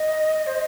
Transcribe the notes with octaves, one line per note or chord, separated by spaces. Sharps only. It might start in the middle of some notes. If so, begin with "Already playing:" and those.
Already playing: D#5
C5